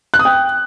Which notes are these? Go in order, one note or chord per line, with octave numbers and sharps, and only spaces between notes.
F#6
D#6
G5